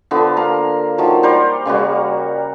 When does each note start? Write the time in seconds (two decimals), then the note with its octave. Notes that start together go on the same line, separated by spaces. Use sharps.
0.11 D3 F3 B3 D6
0.37 A#3 F5 A#5
0.98 D#3 F3 F#3
1.23 G3 A#4 C5 D5
1.66 C#3 G3 A#3 F#4